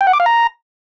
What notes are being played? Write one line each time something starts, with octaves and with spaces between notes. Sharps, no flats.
G5
F#5
D6
F5
A#5